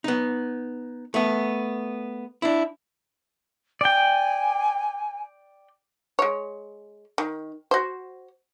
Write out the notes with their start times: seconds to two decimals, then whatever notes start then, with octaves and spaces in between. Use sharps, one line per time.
0.04 B3 D#4
1.14 A3 B3
2.42 D4 E4
3.81 D5 G5 G#5
6.19 G#3 C#5
7.18 D#3
7.71 F#4 C5